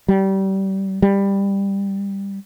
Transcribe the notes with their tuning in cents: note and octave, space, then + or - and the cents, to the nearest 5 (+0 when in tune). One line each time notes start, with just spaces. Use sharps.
G3 -25
G3 +15